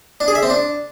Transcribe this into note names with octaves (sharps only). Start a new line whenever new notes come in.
D4
G#4
E5
C4
D4